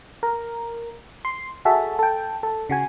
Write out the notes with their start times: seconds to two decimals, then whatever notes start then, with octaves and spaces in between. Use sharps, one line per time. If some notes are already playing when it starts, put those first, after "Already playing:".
0.23 A#4
1.25 C6
1.65 F#4 G#4 A4 E5
1.99 A4 G5
2.43 A4
2.70 C#3 F#4 G#5